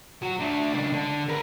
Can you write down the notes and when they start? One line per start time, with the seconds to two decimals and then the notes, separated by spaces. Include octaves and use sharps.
0.22 F#3 F#4
0.39 D3 A3
0.73 C#2 D4
0.92 D3
1.29 A#4 B4